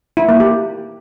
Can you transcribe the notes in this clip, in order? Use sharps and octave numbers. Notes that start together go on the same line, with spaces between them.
E4
A#3
G4